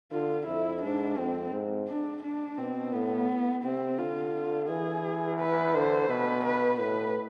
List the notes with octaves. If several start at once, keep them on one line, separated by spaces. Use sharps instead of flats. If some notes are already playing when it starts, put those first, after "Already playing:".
D3 F4
F2 E4
G#2 D4
F2 C4
G#2
D4
D4
B2 C4
A2 B3
C3 C4
D3 F4
E3 G#4
B4
D3 C5
B2 B4
B4
A2 B4